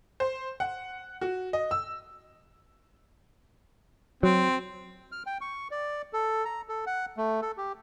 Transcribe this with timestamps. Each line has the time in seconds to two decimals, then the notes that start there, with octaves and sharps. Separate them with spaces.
0.20 C5
0.60 F#5
1.21 F#4
1.53 D#5
1.71 E6
4.23 F#3 C4
5.12 F6
5.26 G5
5.41 C#6
5.71 D5
6.13 A4
6.45 A#5
6.69 A4
6.87 F#5
7.17 A3
7.42 A4
7.57 G4